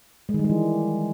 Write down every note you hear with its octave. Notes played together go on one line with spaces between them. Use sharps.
G#3
D#3
G3
G#3
E3